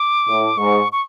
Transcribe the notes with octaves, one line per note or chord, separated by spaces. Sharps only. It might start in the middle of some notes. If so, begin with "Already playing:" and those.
Already playing: D6
A2
G#2 C#6
C#6